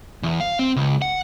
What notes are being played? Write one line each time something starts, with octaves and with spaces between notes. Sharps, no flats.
E2
F5
C4
C#2
F#5